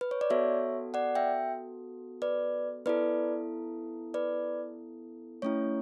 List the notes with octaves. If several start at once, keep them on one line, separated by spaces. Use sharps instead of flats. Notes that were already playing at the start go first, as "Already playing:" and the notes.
B4
C#5
D5
B3 F#4 A4 C#5 E5
D5 F#5
E5 G5
B4 D5
B3 E4 A4 B4 D5
B4 D5
A3 C#4 E4 C#5